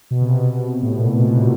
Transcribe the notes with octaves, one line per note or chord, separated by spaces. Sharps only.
B2
C3
B2
A2
A#2
B2
B2
C3